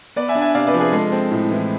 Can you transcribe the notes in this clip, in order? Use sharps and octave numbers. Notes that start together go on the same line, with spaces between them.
B3 B4 D5
E5 G#5
D4
E5 G#5
C3 D5 F5
B4 D5
F3
G#4 B4
G#3 A4
C4
A2
E3